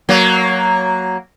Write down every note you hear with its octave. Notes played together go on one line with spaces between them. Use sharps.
F#3 A#3